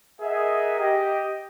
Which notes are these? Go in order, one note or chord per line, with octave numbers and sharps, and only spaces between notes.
G#4 A#4 D#5 E5 F#5
G4 D#5